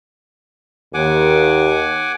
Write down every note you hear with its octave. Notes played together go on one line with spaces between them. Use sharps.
D#2 F#5 G#5 D6